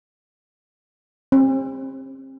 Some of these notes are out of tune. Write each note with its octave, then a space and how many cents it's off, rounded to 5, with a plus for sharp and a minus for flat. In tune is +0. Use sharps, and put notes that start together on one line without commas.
C4 +35